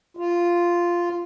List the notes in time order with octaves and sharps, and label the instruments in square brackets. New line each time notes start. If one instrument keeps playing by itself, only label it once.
[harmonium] F4